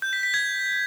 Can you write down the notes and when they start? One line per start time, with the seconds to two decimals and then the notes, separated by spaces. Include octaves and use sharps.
0.02 G6
0.13 B6
0.23 B6
0.34 G#6